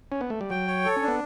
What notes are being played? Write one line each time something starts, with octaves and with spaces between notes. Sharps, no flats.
C#4
B3
A3
G3
F#3 G5
C#5
A4
C#4
D4
B3